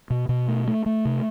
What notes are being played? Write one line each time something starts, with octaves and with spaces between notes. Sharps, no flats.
B2
B2
A3
A3
A3
C3